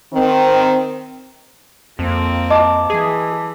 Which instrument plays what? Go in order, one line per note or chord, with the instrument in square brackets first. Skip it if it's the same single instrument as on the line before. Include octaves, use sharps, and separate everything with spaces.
[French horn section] D#3 C4
[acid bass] F2 [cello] A#3 C4
[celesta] D#5 [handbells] A5 D6
[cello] E3 [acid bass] G#4